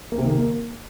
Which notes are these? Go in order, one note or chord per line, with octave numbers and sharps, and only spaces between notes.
A#3
C3
D#3
A#3